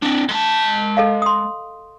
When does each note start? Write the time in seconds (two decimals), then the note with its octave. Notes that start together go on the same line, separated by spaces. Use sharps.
0.03 C4 D4
0.29 G#3 A5
0.97 A4 D#5 F5
1.22 C6 D#6